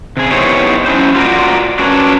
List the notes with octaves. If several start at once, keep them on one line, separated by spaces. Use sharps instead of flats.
C3 G#4
B3 D#4 E4 G4 C5 C#5
F#3 C#4 E4 C5
F4 F#4 A4 A#4 D5
C#4 D4 F#4 A#4 B4 C#5